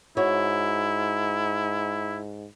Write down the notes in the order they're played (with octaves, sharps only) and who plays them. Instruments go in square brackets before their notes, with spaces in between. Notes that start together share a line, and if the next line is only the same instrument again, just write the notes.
[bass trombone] G#2 [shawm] E4 [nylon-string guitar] F#4 C#5